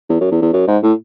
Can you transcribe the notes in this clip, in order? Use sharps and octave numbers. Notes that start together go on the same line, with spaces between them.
E2
F#2
E2
E2
F#2
G#2
A2